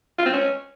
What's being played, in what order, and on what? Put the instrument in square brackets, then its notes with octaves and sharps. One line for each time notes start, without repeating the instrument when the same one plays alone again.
[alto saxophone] F4
C4
C#4